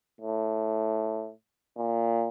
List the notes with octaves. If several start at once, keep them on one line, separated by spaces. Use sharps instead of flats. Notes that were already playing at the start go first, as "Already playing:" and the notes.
A2
A#2